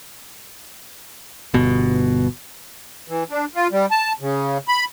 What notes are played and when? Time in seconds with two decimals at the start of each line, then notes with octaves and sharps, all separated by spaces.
1.54 G1 B2
3.08 E3
3.30 D4
3.55 F4
3.71 G3
3.91 A5
4.21 C#3
4.68 B5